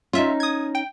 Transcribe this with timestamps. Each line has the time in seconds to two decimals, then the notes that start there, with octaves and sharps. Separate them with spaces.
0.13 C#4 D#4 F4 E5
0.40 D#6 G#6
0.75 G5